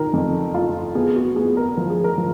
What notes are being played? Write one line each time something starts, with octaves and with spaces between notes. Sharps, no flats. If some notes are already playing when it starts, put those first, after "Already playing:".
Already playing: D#3 A#4
F2
F4
B3 G#4
F#4
B3 G#4
A#4
F3 A#4
G#4
A#4
F3